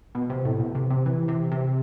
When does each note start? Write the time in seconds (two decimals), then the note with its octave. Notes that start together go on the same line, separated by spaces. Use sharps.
0.15 B2
0.30 C3
0.45 A2
0.60 B2
0.75 C3
0.90 C3
1.06 E3
1.28 C3
1.52 C3